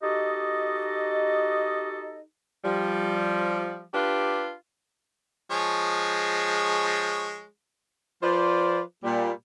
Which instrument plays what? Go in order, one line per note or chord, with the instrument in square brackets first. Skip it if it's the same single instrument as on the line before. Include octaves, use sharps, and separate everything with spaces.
[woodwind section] D#4 F#4 G4 A4 D#5
[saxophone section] F3 G3
D4 F4 G4 B4
[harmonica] F3 G#3 C#5
[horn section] F3 F4 B4 C5 D5
A#2 G3